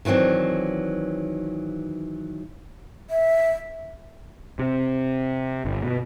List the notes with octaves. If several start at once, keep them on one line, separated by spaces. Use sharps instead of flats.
D#3 E3 F#3 C4 D4
E5
C3
G1
B2